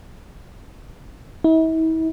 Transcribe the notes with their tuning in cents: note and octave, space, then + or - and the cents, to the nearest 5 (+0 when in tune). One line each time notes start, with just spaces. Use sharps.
E4 -40